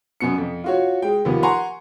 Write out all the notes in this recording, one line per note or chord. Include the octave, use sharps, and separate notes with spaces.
F#2 B2 C#7
F2
F4 F#4 C#5
G#3 G5
D#2 F3 B3
F#5 G#5 A#5 C6 C#6